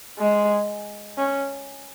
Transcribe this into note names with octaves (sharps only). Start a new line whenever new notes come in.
G#3
C#4